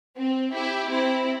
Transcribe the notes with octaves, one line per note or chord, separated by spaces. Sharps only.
C4
E4 G4
C4 E4